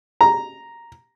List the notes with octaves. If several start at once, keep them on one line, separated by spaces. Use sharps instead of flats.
A#5